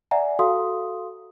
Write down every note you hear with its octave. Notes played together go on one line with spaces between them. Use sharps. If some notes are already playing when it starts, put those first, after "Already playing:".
D5 E5 F#5 G#5 A#5
F#4 A4 F5 C6 D#6